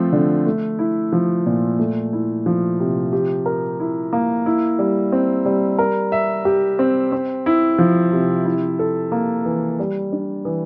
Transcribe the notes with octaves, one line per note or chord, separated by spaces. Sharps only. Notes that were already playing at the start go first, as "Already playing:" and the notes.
Already playing: F3 A3 C4
D3
A3
E4
F3
A#2
A3
E4
F3
C3
G4
A#4
E4
A#3
E4
G3
C4
G3
A#4
E5
G4
C4
C4
E4
F3
C3
E4
A4
A#3
E3
G3
D4
E3